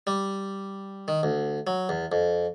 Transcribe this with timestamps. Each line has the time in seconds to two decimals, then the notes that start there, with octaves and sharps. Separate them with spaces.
0.07 G3
1.08 D#3
1.23 D2
1.67 F#3
1.89 E2
2.12 F2